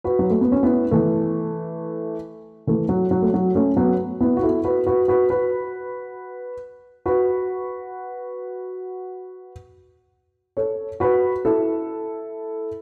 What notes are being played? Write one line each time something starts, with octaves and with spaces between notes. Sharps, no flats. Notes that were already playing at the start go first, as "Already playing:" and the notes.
F#4 B4
F#3
A3
B3
C#4
B3 E4
E3 A3
E3 A3
F#3
F#3
A3
F#3
A3 C#4
F#3 B3
B3 E4
F#4
E4 A4
F#4 B4
F#4 B4
F#4 B4
F#4 B4
F#4 B4
A4 C#5
F#4 B4
E4 A4